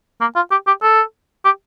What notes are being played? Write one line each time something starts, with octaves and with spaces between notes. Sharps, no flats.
A#3
F4
G4
G4
A4
G4